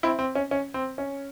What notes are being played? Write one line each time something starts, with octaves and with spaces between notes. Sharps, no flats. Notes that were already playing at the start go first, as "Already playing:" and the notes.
C4 E4
C4
C#4
C#4
C4
C#4